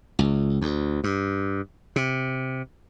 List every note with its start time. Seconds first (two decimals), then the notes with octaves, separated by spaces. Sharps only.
0.19 C#2
0.62 D2
1.04 G2
1.96 C3